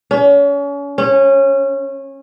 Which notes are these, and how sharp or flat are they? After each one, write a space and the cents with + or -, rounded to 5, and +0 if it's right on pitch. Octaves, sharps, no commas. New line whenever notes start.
C#4 +35
C#4 -20